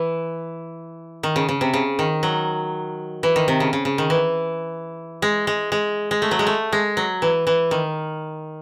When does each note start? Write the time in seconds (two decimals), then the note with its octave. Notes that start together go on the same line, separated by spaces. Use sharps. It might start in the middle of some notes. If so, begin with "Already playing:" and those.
Already playing: E3
1.23 D#3
1.36 C#3
1.49 C#3
1.61 C3
1.73 C#3
1.99 D#3
2.23 F#3
3.23 E3
3.36 D#3
3.48 C3
3.60 C#3
3.73 C#3
3.85 C#3
3.98 D#3
4.10 E3
5.22 G#3
5.47 G#3
5.72 G#3
6.11 G#3
6.22 A3
6.31 F#3
6.39 G#3
6.47 A3
6.72 G#3
6.97 F#3
7.22 E3
7.47 E3
7.71 D#3